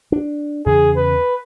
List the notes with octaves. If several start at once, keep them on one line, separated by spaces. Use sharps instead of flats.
D4
E2 C#3 G#4
B4